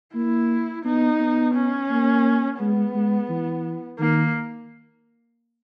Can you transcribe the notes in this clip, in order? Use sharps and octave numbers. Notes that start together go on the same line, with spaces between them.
A#3 E4
B3 D#4
B3
C#4
A#3
G#3 B3
G#3
E3
D#3 A#3